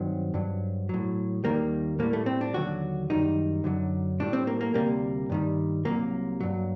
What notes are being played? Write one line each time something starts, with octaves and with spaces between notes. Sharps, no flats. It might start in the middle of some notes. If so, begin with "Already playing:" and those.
Already playing: G2 D#3 F#3 C4
G2 F#3
A2 F#3
D#2 D#3 G3 A#3
A2 G3 A#3
A3
C4
D4
D#2 D3 F#3 F#4
F#2 D#3 G3 D#4
F#2 D3 F#3
A2 G3 D4
C4
A#3
A#3
D2 C3 G3 A#3
G2 D#3 G3
C2 C3 D#3 F#3 A#3
G2 F#3